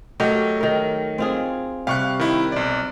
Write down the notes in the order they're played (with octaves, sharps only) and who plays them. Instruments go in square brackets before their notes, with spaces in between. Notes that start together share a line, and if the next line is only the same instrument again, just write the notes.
[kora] F#3 G4 A#4 [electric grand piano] A3 C#5 D#5
[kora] D#3 A#4
C4 F4 G#4
[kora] C3 G3 [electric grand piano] F5 C#6 F#6
[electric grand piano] D#3 E4
B1 D5